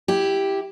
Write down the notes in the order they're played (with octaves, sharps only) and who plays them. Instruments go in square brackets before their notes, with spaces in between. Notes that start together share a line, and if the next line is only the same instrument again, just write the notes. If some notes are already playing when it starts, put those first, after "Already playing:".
[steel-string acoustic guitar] E4 G4